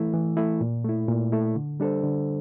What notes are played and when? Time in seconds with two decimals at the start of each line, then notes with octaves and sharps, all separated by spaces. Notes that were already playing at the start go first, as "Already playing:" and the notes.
Already playing: E3 A3 E4
0.13 E3
0.37 A3 E4
0.61 A#2
0.85 A3 E4
1.08 A#2
1.32 A3 E4
1.56 D3
1.80 G3 D4 A4 C5
2.03 D3